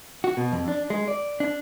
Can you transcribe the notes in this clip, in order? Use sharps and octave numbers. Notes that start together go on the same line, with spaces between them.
F#4
B2
F2
D4
G#3
D5
D4